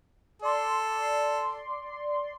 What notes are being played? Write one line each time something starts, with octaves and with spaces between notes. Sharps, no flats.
A4 D5 C6